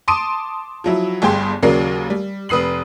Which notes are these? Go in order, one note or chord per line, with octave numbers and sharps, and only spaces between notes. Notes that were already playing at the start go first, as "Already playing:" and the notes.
A5 C6 D6 D#6 D7 D#7
F3 F#3 E4
G1 G2 G#4 G5 C6
D#2 C#3 F#3 A#4 D5 C7
G3
F1 B4 D#6 C7 F#7